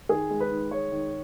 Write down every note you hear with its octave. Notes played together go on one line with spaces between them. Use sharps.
D#3 G#4
G#3
B4
D#3
G#3 C#5
D#3